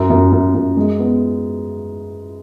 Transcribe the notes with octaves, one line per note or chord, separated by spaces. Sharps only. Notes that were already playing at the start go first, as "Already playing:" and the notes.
Already playing: F#2
F#2
F#2
F#2
G#3
B3